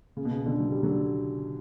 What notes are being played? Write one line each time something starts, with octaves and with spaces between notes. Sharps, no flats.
C#3
B2
C#3
B2 D3
F#3
G3
D3 F#3